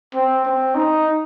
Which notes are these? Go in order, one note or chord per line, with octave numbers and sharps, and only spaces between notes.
C4
C4
D#4